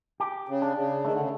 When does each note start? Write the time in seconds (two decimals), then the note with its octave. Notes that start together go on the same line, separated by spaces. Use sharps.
0.20 G4
0.49 C#3
0.62 D4
0.77 C#3
1.04 D#3 A3
1.13 D3
1.21 C#3